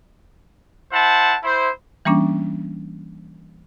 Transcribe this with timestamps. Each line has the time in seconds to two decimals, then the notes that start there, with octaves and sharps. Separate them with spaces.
0.92 E4 C5 F#5 A5
1.43 E4 C5
2.05 E3 G3 A#3 C#4 D4